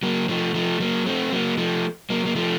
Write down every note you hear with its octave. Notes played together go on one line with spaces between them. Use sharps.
F#3 A#3
F3 A3
F3 A3
F#3 A#3
A3 C4
F#3 A#3
F3 A3
F#3 A#3
A#3
F3 A3